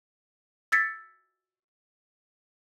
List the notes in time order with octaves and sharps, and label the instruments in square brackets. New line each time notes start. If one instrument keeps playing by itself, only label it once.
[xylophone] E6 G#6 A6 B6 C#7